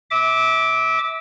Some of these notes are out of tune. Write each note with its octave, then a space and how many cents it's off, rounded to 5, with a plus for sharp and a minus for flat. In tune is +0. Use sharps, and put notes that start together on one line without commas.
E5 -25 D6 +0